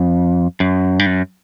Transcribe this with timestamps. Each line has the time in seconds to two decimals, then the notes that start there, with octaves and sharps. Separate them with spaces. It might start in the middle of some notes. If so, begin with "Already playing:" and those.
Already playing: F2
0.60 F#2
0.99 G2
1.06 F#2